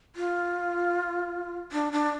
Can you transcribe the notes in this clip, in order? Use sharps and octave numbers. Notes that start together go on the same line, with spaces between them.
F4
D4
D4